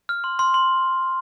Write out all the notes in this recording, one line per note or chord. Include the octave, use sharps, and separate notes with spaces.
F6
C6
C6
C6